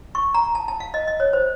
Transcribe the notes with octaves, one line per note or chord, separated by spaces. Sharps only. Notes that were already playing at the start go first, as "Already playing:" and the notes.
C#6
A#5
A5
A5
F5
D#5
D#5
C#5
C5